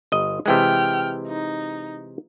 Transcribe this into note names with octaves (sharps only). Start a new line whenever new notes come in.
G1 D#5
C3 E3 G#3 G5 F6
D#4